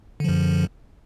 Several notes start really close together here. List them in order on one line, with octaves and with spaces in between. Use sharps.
D3 F3 F#2